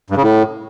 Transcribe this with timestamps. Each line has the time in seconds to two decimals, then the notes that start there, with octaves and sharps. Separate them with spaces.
0.10 G2
0.17 C#3
0.23 A2